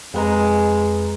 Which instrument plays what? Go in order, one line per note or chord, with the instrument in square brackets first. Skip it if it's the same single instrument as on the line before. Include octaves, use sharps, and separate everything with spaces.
[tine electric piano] F2 B4 A#5 [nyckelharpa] G#3